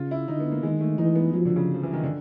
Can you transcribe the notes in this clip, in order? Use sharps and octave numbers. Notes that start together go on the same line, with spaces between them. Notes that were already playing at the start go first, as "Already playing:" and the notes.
Already playing: C#3 F4
E4
D3 D#4
B3
A#3
D#3 G#3
A3
E3 D#4
B3
F3 F#3
D3
C#3
F3
E3
D#3
D3